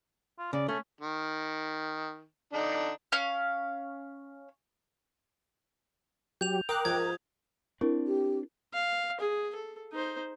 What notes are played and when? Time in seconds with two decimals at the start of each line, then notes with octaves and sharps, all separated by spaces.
0.39 F4
0.53 C#3 D5
0.68 A3 C#4
1.01 D#3
2.53 D3 D4 D#4
3.12 C#4 F5
6.41 F#3 G4 G6 F7
6.69 A#4 F5 G5 D6 D#6 F#6
6.85 G#2 F3 G#6
7.81 C4 D4 E4 A#4
8.06 G4
8.73 F5
9.20 G#4
9.55 A4
9.92 D#4 C5